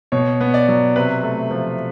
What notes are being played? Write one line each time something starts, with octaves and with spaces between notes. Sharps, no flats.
B2 C#5
B3
D5
F#3
C3 B4
A3
F3